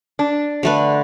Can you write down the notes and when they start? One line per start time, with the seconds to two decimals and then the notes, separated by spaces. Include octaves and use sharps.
0.19 D4
0.63 D3 A3 B4